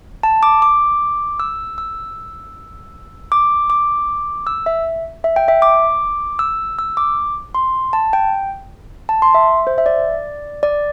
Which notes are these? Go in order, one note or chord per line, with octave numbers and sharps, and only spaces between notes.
A5
D6
D6
E6
E6
D6
D6
E6
E5
E5
G5
E5
D6
E6
E6
D6
C6
A5
G5
A5
C6
E5
C5
E5
D5
D5